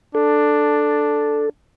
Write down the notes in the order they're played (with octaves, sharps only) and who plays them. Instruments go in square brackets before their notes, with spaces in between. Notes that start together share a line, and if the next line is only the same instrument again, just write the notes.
[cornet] D4 [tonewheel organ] A4